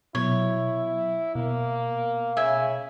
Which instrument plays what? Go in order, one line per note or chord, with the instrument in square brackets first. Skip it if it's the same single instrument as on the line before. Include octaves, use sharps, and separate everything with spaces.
[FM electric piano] B2 F#3 [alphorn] E4 [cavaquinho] C#5
[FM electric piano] B2 [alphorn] A#3
[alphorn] C#3 [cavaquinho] E5 G#5